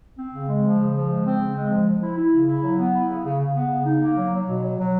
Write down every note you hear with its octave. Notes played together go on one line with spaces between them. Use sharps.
C4
C#3
G#3
F3
C#3
F3
G#3
C4
C#3
G#3
F3
F3
E4
E4
C#3
E4
F#3
B3
E4
C#3
C#3
C#3
B3
C#3
D#4
A#3
F#3
F#3
B2
F#3
F#3